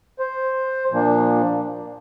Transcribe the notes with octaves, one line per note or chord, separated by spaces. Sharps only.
C5
A#2 F3 A#3 D4